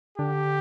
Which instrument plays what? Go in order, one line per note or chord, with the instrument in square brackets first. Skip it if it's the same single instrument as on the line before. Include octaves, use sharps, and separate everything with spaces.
[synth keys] D3 [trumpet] G4